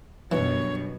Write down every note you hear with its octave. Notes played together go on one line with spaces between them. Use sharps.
G1 F#2 B2 E3 C#5